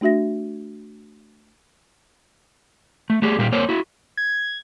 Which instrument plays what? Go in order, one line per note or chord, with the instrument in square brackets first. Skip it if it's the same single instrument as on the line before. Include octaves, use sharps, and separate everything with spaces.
[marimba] A3 D4 F#4 E5 A#6
[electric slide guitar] A3
A3 G4 G#4
A#2 G3 A#3 G4
A#3 A#4 C5 C#5
E4 F#4
[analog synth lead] G#6